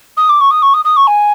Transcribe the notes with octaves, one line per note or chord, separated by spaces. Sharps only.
D#6
D6
C#6
D#6
C#6
D#6
D#6
C#6
G#5